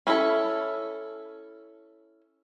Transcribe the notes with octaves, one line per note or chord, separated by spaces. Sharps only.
C#4 E4 F4 A4